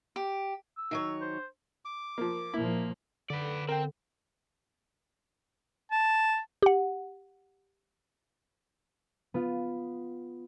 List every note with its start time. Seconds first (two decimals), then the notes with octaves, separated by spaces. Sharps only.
0.16 G4
0.78 E6
0.91 D#3 F#3 C#5
1.21 C5
1.85 D6
2.18 F3 A#3
2.54 A#2 F3 A#3 E4
3.30 D3 B4 D5
3.69 C4 A#4 G5
5.91 A5
6.62 G4 F#5
9.34 B3 F4